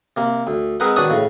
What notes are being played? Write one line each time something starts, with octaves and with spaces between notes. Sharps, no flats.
C3 A#3
D2
G#3 C4 G#4 A#4 B4 F#5
B2 D#3 D4 C#5 F#5 D#6
A2 C#3